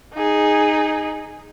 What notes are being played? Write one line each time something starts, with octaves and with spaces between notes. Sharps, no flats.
D#4 G#4